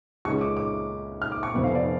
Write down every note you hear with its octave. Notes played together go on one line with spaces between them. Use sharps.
C#2 C#3 G#3 C#4 C#6
D6
D6
F6
D6
C#6
F1 F2 F3 B3
F5
D5